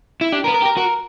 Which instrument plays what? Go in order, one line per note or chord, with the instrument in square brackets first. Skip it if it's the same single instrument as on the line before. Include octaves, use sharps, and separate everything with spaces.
[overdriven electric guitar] E4
[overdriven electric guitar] D4 [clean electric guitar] G4
[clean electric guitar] A#4
[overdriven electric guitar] B3
[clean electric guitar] A#4
[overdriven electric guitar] G4
[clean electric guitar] A#4
[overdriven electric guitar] F#4 [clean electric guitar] A#4